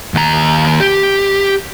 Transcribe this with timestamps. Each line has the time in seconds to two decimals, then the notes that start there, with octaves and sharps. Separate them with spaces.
0.14 D#2 A#5
0.80 G4